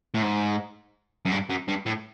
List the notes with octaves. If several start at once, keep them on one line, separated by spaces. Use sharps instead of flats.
A2
G#2
F#2
G2
F#2
G2
A2